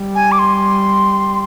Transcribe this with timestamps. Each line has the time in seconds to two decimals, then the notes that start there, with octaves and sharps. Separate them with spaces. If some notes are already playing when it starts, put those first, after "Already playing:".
Already playing: G3
0.15 G#5
0.32 D6
0.39 C6